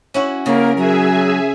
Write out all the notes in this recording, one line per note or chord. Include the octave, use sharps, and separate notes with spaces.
C#4 E4 F#4
C#3 A#3 A#4
F#3 G#4 E5 G#5